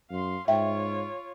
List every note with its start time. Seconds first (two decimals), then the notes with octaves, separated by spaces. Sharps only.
0.11 F#2 F5 C6
0.48 G#2 F4 C#5 E5 G5